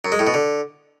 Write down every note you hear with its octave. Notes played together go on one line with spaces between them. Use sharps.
F#2
G#3
A2
B2
D3